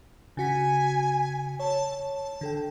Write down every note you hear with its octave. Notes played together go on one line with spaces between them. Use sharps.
C#3 F#4 G#5 B6
C#5 A5
A5
D3 A4 G5